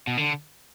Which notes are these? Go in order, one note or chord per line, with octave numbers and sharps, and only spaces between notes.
B2
D3